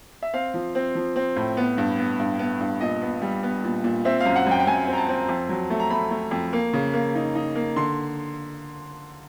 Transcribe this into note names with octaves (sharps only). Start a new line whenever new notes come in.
E5
C4 F5
F3
C4
F3
C4
A2
B3
G2
B3
G2
B3
G2
A#2 D#5
B3
G3
B3
A#2
A#2
C4 E5
F#2 F5
F#5
F#2 G5
G5
F#2 G#5
C4
A#5
A5
C4
F2
F#3
A3
A#5
A3 B5
A3
F2
A#3
C#3
A#3
D#4
D#4
A#3
D3 C6